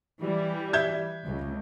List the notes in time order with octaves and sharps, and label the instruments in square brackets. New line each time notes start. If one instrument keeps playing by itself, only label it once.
[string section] E3 G3
[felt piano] E5 G6 G#6
[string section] C#2